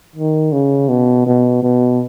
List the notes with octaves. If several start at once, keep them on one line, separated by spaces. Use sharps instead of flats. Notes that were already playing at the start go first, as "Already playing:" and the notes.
D#3
C#3
B2
B2
B2